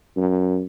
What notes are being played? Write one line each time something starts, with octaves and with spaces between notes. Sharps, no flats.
F#2